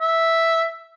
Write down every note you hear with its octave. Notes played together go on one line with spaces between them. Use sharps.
E5